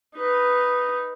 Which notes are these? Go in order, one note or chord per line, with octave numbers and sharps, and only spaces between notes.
D#4 B4